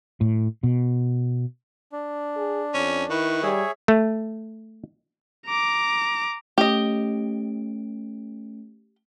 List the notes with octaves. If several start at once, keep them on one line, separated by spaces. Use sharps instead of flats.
A2
B2
D4
G#4
F2 C#4
D#3 E4 B4 C#6
G3 G#4 C#5 E5
A3
A#5 D6
A3 C#4 G4 D#5 D7